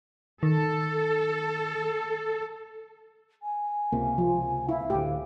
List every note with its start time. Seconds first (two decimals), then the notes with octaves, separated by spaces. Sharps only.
0.43 D#3 A4
3.42 G#5
3.92 C#2 C3 A#3
4.18 F3
4.69 E4 F5
4.90 D2 A2 G4